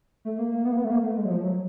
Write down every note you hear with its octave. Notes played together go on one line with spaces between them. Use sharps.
A3
A#3
A#3
B3
A#3
B3
A3
A#3
A3
G#3
F#3
F3
F#3